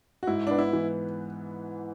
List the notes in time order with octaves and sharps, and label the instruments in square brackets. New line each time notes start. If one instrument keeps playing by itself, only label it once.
[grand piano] F#4
[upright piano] G#2 [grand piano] E4
[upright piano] B3 [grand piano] D4
[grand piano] E4
[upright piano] E3